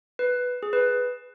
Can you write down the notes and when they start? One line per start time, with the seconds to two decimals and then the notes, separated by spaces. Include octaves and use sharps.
0.19 B4
0.63 G#4
0.73 B4